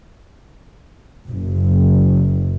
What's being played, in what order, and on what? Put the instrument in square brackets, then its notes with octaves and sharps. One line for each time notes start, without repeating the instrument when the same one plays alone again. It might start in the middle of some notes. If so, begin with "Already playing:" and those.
[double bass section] F#1